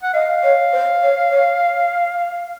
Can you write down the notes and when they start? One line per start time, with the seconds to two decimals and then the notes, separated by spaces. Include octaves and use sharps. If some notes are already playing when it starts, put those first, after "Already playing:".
0.03 F#5
0.13 D#5 F5
0.42 C#5
0.72 C5
1.01 C#5
1.30 C#5